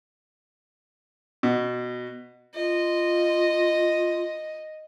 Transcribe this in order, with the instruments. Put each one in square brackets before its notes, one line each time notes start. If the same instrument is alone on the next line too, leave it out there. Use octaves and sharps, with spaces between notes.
[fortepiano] B2
[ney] F4 [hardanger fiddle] D#5